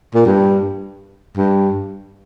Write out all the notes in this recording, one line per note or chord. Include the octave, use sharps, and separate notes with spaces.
A#2
G2
G2